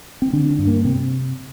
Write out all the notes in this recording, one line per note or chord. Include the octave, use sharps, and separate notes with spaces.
C4
D3 D4
D4
G2
A#3
C3 C4